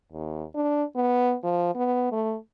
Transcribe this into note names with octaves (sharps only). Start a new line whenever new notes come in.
D#2
D4
B3
F3
B3
A3